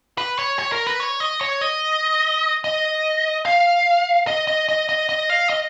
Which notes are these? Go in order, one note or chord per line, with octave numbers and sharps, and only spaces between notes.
B4
C#5
C#5
A#4
B4
C#5
D#5
C#5
D#5
D#5
F5
D#5
D#5
D#5
D#5
D#5
F5
D#5